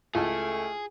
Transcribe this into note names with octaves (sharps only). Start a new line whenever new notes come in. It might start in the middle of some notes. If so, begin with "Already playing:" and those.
C#2 A3 E4 F4 G#4 A4 F5